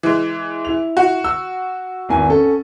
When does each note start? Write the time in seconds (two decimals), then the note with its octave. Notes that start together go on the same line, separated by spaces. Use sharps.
0.03 E3 G#3
0.65 E4 F7
0.97 F#4
1.24 E6
2.09 G#1 E2 G#5
2.29 C#4 A4